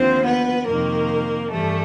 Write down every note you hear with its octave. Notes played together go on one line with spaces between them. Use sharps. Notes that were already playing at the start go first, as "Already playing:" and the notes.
Already playing: D#2 D3 F3 C4 C5
B3 B4
F2 C3 D#3 A#3 A#4
G2 E3 G3 A3 A4